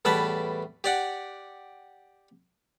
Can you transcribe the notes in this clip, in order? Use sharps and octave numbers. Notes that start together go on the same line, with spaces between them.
E2 A2 G3 B4 A5
G4 D5 F#5